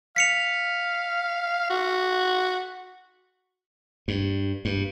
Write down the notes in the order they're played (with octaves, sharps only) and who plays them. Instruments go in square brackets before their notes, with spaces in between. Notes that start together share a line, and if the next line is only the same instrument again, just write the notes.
[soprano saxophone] F5 [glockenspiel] B6 C#7 F7
[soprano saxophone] F#4
[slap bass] G2
G2